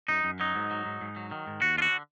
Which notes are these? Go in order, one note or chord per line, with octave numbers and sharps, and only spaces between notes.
F#2 D#4
F#2
F#3 D#4
G#2
F#3
G#2
G#2
F#3
D#3
G#2
D#2 F#4
D3 F4 F#4